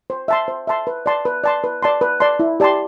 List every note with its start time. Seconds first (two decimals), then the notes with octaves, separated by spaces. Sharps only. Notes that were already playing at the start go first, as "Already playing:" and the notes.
0.10 C5
0.28 E5 A5 C6
0.48 C5
0.67 E5 A5 C6
0.87 B4
1.06 D5 A5 C6
1.25 B4
1.44 D5 A5 C6
1.64 B4
1.83 D5 A5 C6
2.01 B4
2.20 D5 A5 C6
2.39 E4
2.60 G4 D5 A5 C6